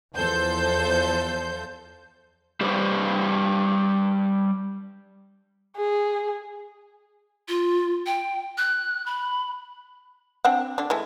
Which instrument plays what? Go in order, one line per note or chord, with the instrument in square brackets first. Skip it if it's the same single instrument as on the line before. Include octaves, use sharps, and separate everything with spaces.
[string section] E2 F3 A4 C5 G6
[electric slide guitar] G3 G4 B4 C5 D5
[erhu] G#4
[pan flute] F4
G5
F#6
B5
[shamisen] C4 D4 F#5
D3 D4
E3 G#3 A3